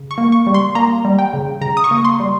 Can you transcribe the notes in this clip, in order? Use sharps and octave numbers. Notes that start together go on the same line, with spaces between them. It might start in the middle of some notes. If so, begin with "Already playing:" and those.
Already playing: C#3
C#6
A#3
C#6
G3
C6
A#3 A#5
G3
G5
C#3
C#3 A#5
D#6
C#6
A#3
C6
G3